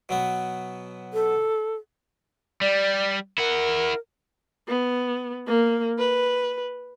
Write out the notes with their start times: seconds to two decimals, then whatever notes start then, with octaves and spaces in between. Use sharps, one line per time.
0.09 B2 F#3 B3
1.13 A4
2.61 G3 D5
3.38 E4 A#4 F#5
4.68 B3
5.47 A#3
5.99 B4